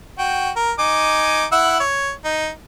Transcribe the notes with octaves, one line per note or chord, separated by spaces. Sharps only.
F#4 G5
A#4
D#4 G#5 D6
E4 F#5 E6
C#5
D#4